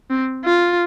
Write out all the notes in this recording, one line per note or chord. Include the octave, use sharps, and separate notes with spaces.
C4
F4